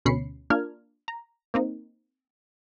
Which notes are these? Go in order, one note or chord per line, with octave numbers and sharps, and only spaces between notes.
D2 B2 C#4 B5 C7 C#7
A#3 D4 F4 A#4 F6 G#6
A#5
A#3 C4 D#4